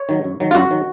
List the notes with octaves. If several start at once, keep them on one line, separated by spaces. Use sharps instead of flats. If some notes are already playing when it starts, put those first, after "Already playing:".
Already playing: C#5
D#3 F#3
F#2
D#3 F#3
F4
F#2 F#4
D#3 F#3